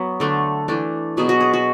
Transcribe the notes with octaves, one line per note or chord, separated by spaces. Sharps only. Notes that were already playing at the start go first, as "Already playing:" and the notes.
Already playing: F#3 B3
D3 A3 D4
E3 A3 D4
B2 F#3 B3 G#4
F#4
G#4
F#4